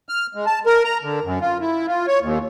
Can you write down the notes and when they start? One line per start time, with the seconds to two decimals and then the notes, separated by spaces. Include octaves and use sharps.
0.09 F6
0.35 G#3
0.46 A5
0.66 A#4
0.84 A#5
1.03 D3
1.24 F#2
1.41 F4
1.61 E4
1.87 F4
2.07 C#5
2.21 D#2